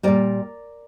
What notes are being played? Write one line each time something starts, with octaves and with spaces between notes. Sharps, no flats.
A#2 G3 A#4 D5